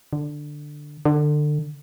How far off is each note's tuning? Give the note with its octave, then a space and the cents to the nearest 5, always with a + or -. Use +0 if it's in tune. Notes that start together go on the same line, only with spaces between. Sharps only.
D3 +10
D3 +25